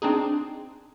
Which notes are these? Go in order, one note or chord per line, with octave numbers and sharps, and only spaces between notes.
C4 D4 D#4 G#4